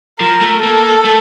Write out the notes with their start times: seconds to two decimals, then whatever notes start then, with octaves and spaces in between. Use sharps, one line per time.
0.20 F3 A#4
0.41 A3
0.62 A#3 A4
1.05 A3